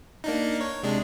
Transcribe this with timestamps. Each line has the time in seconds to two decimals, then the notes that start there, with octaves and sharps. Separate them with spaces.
0.24 A#3 D4 D#4
0.61 C#5
0.83 C3 G#3 D4